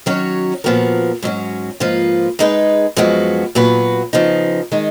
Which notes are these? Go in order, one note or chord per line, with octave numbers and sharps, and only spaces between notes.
D#3 F#3 C#4 F#4 C#5
A#2 F3 B3 F#4 A#4
G#2 F#3 C#4 F#4
G#2 F3 A#3 F4 B4
G#3 D#4 G#4 B4
F#2 F3 G#3 B3 F#4
A#2 F#3 B3 F#4 B4
C#3 F3 B3 D#4
D#3 G#3 D#4